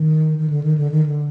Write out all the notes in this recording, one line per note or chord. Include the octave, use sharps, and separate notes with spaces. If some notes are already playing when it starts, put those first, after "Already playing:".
Already playing: D#3
D#3
D3
D#3
D3
D#3
D3